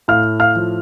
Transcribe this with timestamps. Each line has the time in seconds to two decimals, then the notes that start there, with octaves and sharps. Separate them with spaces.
0.08 A2 F5 F6
0.40 F5 F6
0.55 F3